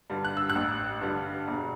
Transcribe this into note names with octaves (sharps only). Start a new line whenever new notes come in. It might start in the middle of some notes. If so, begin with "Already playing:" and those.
G2 D3 G3
F#6
E6
F#6
A1
G2 D3 G3
E1